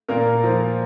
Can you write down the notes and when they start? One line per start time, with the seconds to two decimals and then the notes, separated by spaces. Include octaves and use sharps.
0.08 A#2 A#3 A#4
0.44 F3